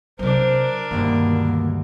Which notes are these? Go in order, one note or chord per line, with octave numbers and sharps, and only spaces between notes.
C3 F#3 D4 A#4 C5
D2 G2 B2 D#3 A#3